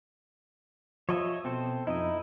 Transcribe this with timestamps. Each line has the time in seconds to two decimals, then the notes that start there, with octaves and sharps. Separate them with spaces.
1.09 F3 C#5 D#5 E5
1.45 B2 C4 A4 C5
1.87 F2 D#4 E4 D#5